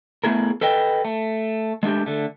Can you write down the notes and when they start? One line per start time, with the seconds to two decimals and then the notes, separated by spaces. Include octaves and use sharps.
0.24 A3 B3 E4 G#4 A#4
0.61 A4 B4 D#5 G5
1.05 A3
1.83 G#3 A3 D4 G4
2.06 D3 A3